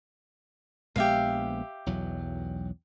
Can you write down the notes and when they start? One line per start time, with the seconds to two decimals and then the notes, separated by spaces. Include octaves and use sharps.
0.96 A#1 G#3 B3 G4 E5 F5
1.86 B1 E2 F#3